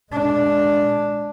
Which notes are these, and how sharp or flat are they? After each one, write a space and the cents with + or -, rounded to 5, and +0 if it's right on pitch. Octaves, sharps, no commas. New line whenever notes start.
G#3 +10 D4 +0